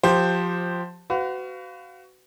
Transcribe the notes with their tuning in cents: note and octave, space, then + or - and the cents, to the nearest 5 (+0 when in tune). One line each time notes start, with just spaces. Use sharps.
F3 +20 G4 +0 C5 +0
F#4 +20 B4 +40 F5 +0